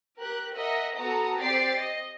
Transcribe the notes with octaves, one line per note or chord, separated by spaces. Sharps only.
G4 A#4 F#6
A#4 D#5 E5 F#5
B3 F#4 A4 A#5 D#6
C4 G4 D5 A6 C7 D7
D#5